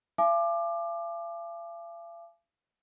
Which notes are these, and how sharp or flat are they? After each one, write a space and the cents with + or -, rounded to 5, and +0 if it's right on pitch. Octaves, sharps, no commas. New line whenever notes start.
F5 -45 G#5 +40 D6 +20